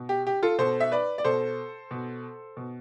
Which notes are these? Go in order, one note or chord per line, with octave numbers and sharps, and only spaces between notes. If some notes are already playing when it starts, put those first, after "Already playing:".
Already playing: B2
G4
G4
F4 A4
B2 A4 C5
E5
B4 D5
D5
B2 A4 C5
B2
B2